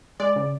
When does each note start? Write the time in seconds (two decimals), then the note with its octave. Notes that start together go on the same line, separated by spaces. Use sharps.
0.20 G#3 D5
0.36 C#3